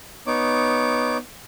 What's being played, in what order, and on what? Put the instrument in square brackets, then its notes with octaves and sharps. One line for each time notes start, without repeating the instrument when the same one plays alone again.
[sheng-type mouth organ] B3 D#4 C#5 D6